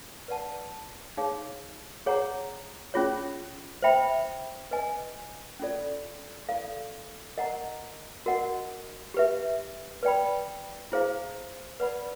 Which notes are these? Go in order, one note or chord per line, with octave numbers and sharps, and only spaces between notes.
B4 D5 F#5 A5
D#4 G#4 C#5 F5
G#4 C#5 F#5 A#5
C#4 F4 G#4 C#5
C5 E5 G5 B5
B4 D#5 G#5
C#4 F4 A4 D5
E4 A4 D5 F5
A#4 D#5 F#5 A#5
F#4 A#4 D#5 F#5
G4 B4 E5
B4 D5 G5 B5
E4 G#4 C5 F5 A#5
B4 D5 F#5 B5